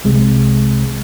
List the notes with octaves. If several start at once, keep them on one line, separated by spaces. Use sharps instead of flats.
C2 C3 G#3